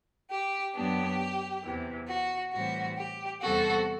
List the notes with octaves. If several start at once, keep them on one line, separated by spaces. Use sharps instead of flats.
G4
F#2 F#3 B3 D4 G4
E2 C3 E3
F#4
A2 E3 G3 C4 F#4
G4
E2 C3 G3 C4 F#4 A4